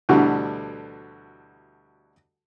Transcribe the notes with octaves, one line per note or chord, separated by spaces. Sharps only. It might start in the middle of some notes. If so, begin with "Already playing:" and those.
D2 B2 D3 E3 G3